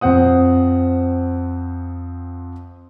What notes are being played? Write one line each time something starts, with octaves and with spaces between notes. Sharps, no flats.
F2 C4 C5 F#5 D#6